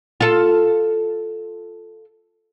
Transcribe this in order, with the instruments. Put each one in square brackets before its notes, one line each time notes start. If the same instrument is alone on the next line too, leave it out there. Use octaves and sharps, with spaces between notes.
[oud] F4 A4